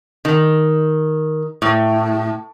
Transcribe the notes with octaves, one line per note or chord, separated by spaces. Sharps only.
D#3
A2